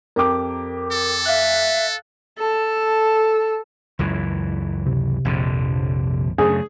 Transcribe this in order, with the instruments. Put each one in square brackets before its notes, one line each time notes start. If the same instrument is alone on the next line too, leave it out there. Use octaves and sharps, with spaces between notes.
[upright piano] F2 G4 D6 [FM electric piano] A#4
[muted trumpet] A4
[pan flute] E5 [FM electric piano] F5 F#6
[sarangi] A4
[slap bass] C#2 F#2 E3
[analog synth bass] C3
[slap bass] A#1 F2 D3
[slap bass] F#2 C#3 A3 [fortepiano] G#4